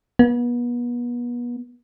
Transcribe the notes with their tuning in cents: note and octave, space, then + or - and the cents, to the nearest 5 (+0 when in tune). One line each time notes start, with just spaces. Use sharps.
B3 -35